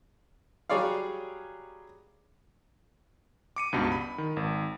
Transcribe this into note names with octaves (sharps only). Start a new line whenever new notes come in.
F#3 G3 G#4 C#5 D5 F5
D6 C#7 D#7
C#2 G2 B2
B5
D#3
G#1